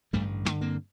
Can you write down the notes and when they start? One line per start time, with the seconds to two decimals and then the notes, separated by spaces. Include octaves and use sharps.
0.13 A1 G2 D3 G3 A3
0.45 A1 G2 D3 A3 B3
0.61 A#3 C4